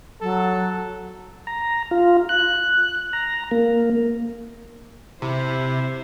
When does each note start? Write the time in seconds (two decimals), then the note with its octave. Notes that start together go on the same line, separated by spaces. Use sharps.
0.21 F#3 A4
1.47 A#5
1.91 F4
2.29 F#6
3.13 A#5
3.51 A#3
5.22 C3 E4 C5